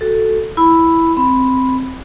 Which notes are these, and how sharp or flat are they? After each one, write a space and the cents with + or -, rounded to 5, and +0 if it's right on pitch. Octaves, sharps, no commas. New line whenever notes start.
F#4 +0 A4 +0
E4 +0 B5 +0
C4 +0 B5 +0